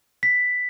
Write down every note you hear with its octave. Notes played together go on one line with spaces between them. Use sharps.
B6